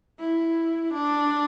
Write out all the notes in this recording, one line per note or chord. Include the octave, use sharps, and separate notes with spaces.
E4
D4